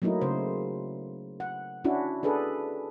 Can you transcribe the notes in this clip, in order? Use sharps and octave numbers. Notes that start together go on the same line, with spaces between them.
F#3 A3 A#3 D#4 E4
C#3 C5
F#5
C#4 D4 E4 F#4
D4 G#4 A4 B4